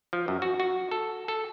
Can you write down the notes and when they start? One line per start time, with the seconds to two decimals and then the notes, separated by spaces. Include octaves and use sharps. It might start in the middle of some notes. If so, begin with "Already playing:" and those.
0.13 F3
0.28 F#2
0.42 F#4
0.60 F#4
0.91 A4
1.28 A4